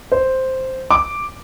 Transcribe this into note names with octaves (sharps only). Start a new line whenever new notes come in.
C5
D6